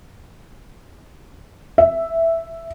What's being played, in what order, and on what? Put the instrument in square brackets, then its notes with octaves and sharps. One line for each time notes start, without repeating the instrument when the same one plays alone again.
[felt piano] E5